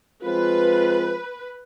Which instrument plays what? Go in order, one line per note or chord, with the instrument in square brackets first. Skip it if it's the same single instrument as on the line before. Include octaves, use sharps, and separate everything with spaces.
[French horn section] F3 G#3 C4 F4 [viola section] B4